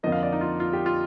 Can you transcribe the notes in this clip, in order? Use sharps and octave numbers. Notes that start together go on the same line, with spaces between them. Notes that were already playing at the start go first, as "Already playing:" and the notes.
F2 D3 F3 A#3 D#5
F5
D5
D#4
F4
F4
G4
F4